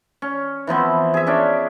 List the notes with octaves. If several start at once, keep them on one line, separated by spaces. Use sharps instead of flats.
C#4
E3 F3 B3 C4
G#4 E5
C#4 D4